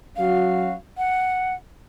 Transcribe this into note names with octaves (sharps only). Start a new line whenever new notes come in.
F#3 C#4 F#4 F5
F#5